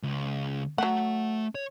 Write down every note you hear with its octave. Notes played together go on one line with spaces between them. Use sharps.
C#2
F#3 A3 F#5 A5
C#5